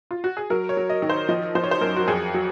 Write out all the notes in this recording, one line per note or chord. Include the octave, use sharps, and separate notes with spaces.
F4
F#4
G#4
F#3 A#4
C#5
F#3
D#5
D#3
C5
F3 D#5
F3 C5
C#5
C5
F#2 A#4
F#4
F2 G#4
F#3